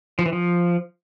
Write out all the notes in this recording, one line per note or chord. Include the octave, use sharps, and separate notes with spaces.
F3
E3
F3